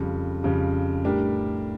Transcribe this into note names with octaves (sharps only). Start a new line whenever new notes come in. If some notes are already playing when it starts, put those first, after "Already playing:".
Already playing: F2 C#3 G3
F2 C#3 G3
A2 G3 D4 G4 A#4